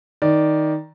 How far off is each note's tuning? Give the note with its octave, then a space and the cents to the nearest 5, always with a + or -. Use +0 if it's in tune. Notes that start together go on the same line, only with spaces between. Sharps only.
D#3 +10 D5 +0